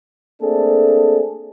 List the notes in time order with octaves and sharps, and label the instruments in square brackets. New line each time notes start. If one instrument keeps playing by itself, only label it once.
[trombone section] A3 A#3 C4 D4 G#4 A4